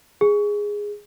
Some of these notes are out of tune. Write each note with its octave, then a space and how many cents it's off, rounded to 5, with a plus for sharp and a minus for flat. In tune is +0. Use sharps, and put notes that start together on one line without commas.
G#4 -5